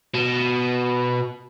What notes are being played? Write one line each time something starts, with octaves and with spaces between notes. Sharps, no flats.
B2